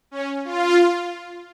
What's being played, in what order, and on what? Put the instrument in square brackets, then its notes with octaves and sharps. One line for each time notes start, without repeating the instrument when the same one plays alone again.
[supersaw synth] C#4
F4